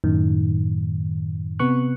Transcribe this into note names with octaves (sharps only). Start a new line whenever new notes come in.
F#2 A2 D#3
C3 B3 B4 C#6 F#6